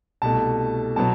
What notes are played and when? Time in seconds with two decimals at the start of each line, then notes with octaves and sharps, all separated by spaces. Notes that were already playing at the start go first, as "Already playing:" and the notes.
0.22 C2 B2 A3 A5
0.96 B2 F#3 B3 A5